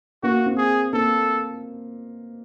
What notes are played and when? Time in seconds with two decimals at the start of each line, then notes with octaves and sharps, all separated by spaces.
0.23 A#3 F#4
0.46 C4
0.57 G#4
0.93 A#3 A4